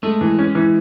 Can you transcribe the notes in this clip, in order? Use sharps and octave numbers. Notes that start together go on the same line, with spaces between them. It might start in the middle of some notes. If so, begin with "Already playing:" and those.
G#3 A3
E3
C#4
E3